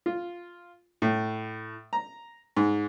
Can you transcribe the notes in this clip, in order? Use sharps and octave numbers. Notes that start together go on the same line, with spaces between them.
F4
A2
A#5
G#2